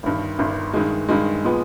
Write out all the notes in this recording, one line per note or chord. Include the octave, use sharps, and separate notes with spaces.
G1 G2 D#3
G1 G2 D#3
G2 D#3 G#3
G2 D#3 G#3
A#2 F3 G#3 B3